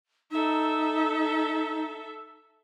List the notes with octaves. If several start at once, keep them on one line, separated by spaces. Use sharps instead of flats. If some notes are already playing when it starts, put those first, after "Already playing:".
D#4 A4 E5